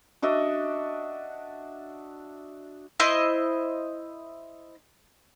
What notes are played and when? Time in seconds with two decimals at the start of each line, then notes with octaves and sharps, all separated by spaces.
0.22 D4 F#4 D#5 E5
3.00 E4 C5 D#5 C6